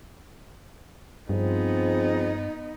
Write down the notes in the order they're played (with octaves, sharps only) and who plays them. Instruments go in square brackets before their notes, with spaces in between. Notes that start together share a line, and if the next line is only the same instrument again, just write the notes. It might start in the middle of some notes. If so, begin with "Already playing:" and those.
[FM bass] G2 [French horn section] F3 C4 G#4 [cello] B3 D#4